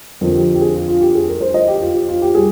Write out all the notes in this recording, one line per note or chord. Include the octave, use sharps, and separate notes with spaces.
F2 D3 F3 C4 A#4
G4
G4
G#4
F4
F4
G4
G#4
A#4
C5
D#5
G4
F4
G4
F4
G4
G3 G#4